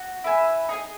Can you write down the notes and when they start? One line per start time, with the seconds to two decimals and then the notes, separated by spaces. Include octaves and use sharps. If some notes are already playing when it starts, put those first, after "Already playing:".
Already playing: F#4
0.24 E4 B4 E5 G#5
0.69 D#4 G#4 D#5 G#5